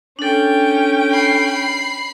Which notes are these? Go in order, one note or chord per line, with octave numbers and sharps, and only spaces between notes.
C#4 D4 A4 G5
B5 C7